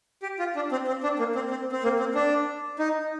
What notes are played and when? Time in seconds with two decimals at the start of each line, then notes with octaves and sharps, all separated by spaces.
0.23 G4
0.39 F4
0.56 D4
0.72 C4
0.87 C4
1.03 D4
1.19 A#3
1.35 C4
1.51 C4
1.72 C4
1.84 A#3
1.99 C4
2.15 D4
2.79 D#4